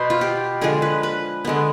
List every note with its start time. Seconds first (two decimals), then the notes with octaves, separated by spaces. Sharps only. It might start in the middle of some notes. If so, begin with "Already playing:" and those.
Already playing: B2 B3 C5
0.10 F4
0.21 G4
0.61 D3 F3 G#3 G#4
0.82 B4
1.03 B4
1.45 D3 G#3 B3